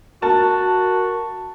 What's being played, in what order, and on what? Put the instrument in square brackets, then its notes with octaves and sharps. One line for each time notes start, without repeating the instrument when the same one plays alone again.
[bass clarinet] F#4 [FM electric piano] A#4 [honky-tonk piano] A5